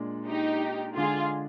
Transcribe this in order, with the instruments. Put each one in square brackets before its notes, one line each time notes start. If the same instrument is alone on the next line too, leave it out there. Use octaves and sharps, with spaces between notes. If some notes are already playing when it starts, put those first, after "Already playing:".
Already playing: [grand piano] A#2 G#3 D4
[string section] D#4 G4
[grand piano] D3 G#3 D4 [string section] F4 G#4